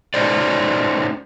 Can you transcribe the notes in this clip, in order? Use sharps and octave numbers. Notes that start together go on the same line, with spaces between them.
A3 C#4 D#4 C5 D5